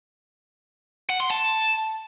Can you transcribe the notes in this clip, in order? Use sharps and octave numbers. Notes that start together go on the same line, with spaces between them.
F#5
C6
A5